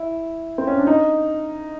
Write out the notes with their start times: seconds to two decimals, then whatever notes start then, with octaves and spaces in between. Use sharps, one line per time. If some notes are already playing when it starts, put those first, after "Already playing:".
Already playing: E4
0.58 C4
0.67 C#4
0.78 D4
0.87 D#4